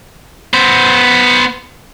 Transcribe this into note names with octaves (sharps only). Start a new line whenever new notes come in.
B3 C5